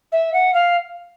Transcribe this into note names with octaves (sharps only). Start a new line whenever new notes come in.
E5
F#5
F5